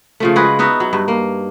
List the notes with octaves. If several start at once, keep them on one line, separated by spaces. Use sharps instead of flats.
C#3 F3 A3
G#3 F#4 G#4 B4
B3 D#4 F#4 E5
F#3
G2
A#3